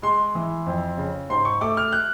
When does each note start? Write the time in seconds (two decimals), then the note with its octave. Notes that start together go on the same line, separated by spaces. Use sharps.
0.02 G#3 C6
0.35 E3
0.66 F2
0.97 C#3
1.30 G#2 C6
1.45 C#6
1.61 A3 D6
1.77 F6
1.92 F#6